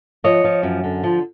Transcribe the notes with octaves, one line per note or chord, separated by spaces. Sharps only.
F3 C#5 D#5
F3
F#2
D3
F3